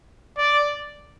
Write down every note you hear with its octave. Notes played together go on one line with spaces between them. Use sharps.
D5